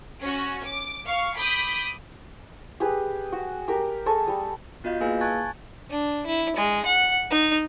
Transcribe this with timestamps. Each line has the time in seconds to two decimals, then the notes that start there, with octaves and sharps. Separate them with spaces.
0.21 C#4 F#4
0.64 D6
1.05 F5 C#6
1.38 B5 D6 D#6 G6 B6
2.80 G4 G#4 B4
3.32 F#4
3.68 G4 A#4
4.06 G#4 A4 D#5 C#6
4.27 G3
4.84 B3 F4 F#4 D#5 F5 G6
5.01 A#3 E4 G#4 B4 F5 G#5
5.21 G#5 A5 C#6 F#6 G#6 A6
5.90 D4
6.26 E4
6.56 G#3
6.85 F#5
7.30 D#4